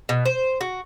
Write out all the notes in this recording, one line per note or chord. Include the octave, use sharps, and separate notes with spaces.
B2
C5
F#4